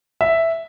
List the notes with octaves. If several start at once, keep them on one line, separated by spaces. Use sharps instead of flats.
E5